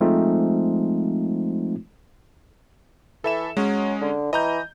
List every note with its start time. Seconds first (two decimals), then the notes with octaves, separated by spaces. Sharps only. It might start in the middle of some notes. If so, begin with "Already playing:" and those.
0.01 F3 G#3 A3 C4 D#4 F4
3.24 E3 A4 E5 E7
3.57 F#3 G#3 C#4
4.01 D3
4.33 E3 D#5 A#5 G6